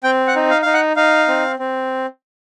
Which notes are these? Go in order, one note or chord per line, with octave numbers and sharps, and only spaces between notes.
C4 G5
F#5
D#4
F5
D#4 F5
F#5
D#4 F5
C4
C4